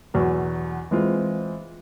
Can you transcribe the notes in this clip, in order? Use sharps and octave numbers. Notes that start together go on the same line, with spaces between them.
E2 B2 F#3
E3 G#3 C4 F4